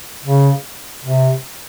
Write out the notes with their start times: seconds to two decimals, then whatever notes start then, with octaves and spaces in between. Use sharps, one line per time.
0.24 C#3
1.05 C3